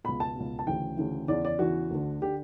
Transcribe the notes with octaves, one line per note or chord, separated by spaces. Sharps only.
C#2 B2 B5
A5
C#2 B2
A5
D2 C#3 E3 G5
D2 C#3 E3
E2 C#3 E3 D5
D5
E2 C#3 E3 F#4
D2 D3
D3 G4